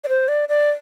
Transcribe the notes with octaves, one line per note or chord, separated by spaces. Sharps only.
D5
C5
D5
D5